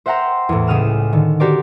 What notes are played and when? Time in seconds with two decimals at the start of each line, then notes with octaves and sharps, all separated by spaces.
0.06 C5 E5 F#5 G5 A#5 C6
0.49 E2 A2
0.67 C#2 C#3 D#6 F6 E7
1.13 D3 D#3
1.40 F#4 G4 A#4 C5 D5